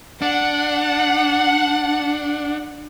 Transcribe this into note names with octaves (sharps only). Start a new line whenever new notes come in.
D4 F#5